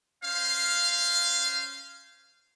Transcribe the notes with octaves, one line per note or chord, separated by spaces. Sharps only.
C#4 C5 F5